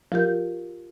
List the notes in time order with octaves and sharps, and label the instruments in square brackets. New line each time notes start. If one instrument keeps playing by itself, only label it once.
[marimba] F3 F4 G4 A#4 G6